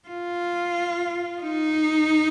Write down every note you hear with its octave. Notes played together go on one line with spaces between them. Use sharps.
F4
D#4